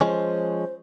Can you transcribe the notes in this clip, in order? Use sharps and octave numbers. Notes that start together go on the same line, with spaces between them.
F3 G#3 C#4 C5